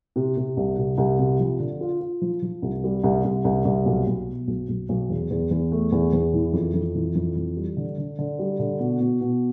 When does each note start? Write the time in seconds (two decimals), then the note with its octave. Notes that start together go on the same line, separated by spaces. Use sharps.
0.16 C3
0.37 C3
0.57 C2
0.78 C3
0.98 C2
1.19 C3
1.39 F3
1.60 D3
1.81 F4
2.01 F4
2.21 F3
2.43 F3
2.62 C2
2.84 G3
3.04 C2
3.24 C2
3.45 C2
3.65 C2
3.86 B1
4.07 B1
4.27 B2
4.48 B1
4.69 B1
4.89 B1
5.09 E2
5.31 E2
5.51 E2
5.72 A3
5.92 E2
6.13 E2
6.34 E3
6.53 F2
6.74 F2
6.95 E3
7.15 F2
7.36 E3
7.56 G3
7.77 D3
7.98 D3
8.19 D3
8.39 G3
8.60 D3
8.80 B2
9.00 B2
9.21 B2